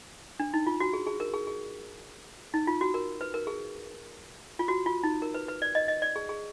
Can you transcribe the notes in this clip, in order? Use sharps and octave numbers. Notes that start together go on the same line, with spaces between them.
D4
D#4
F4
F#4
G#4
G#4
A#4
G#4
G#4
D#4
F4
F#4
A#4
B4
A#4
G#4
F4
F#4
F4
D#4
A#4
B4
B4
D5
D#5
D#5
D5
G#4
G#4